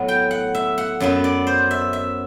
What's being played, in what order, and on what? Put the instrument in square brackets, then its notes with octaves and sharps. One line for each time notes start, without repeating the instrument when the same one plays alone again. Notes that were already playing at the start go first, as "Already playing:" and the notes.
Already playing: [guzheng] A2 F#3 B3
G5
F#5
E5
F#5
F#2 F#3 B3
D5
C5
E5
E5